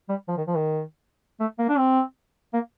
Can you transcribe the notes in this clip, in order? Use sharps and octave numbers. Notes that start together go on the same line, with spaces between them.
G3
F3
D#3
F3
D#3
A3
A#3
D4
C4
A#3